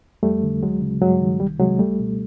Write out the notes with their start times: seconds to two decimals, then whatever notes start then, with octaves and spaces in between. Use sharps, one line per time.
0.23 F2 G3 A3
0.43 D3
0.63 D2 F#3 G#3
0.81 C#3
1.01 G2 F#3 G#3
1.21 D#3
1.40 C2 G3
1.59 C3 F#3 G#3
1.79 C#2 G3 A3
2.00 B2